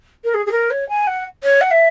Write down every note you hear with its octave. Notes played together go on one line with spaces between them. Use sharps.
A#4
G#4
G#4
A#4
C#5
G#5
F#5
C#5
F#5
E5